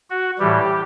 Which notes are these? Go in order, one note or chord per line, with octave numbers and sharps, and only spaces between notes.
F#4
A2 E3 G3 G4